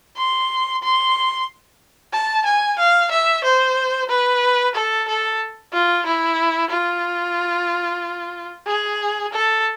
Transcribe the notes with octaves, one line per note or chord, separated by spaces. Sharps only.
C6
C6
A5
G#5
F5
E5
C5
B4
A4
A4
F4
E4
F4
G#4
A4